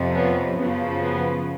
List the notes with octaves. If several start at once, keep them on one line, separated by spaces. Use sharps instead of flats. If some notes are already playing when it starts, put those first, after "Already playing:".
Already playing: F2 C3 F3
B3 C#4
F#2 C#3 F3 B3
B3